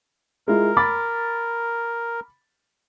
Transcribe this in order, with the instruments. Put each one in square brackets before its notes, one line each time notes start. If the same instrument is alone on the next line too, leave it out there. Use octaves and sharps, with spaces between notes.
[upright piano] G#3 E4 F4 [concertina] A#4
[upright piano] B5 D6 A6